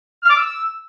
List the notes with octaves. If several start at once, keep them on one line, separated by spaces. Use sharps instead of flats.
F6
D6
E6